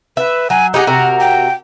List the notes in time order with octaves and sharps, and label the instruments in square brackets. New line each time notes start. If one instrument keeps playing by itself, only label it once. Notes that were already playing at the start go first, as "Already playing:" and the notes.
[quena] B4 [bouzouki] E5
[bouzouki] F#3 [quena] G#5
[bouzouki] D#4 G4 G#4 [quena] F#5
[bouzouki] C3 F#4 A#4
[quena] G5